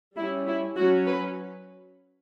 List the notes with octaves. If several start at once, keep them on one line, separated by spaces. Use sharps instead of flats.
G3 C#4 E4
E4
F#3 C#4 F#4
B4